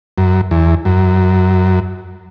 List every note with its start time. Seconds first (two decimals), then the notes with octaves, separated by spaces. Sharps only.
0.18 F#2
0.51 E2
0.85 F#2